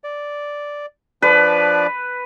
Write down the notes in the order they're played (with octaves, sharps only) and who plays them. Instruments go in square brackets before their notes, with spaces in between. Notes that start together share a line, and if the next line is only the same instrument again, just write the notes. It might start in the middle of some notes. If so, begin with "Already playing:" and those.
[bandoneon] D5
[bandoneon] F3 D4 D5 [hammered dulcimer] B4